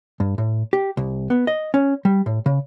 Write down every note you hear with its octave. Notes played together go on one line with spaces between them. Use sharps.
G2
A2
G4
C2
B3
D#5
C#4
G3
A2
C#3